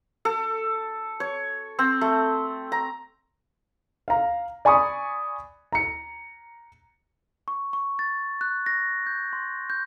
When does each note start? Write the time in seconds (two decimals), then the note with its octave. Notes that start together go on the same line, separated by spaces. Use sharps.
0.25 A4
1.20 C#5
1.79 C4
2.01 A3
2.72 A#5
4.08 F5 A#5
4.65 D5 G#5 B5 C#6 D#6
5.72 A#5 C#7
7.48 C#6
7.73 C#6
7.99 A6
8.41 F#6
8.66 A#6
9.07 G6
9.33 C6
9.70 G6